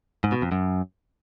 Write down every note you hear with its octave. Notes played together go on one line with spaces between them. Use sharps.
G#2
B2
F2
F#2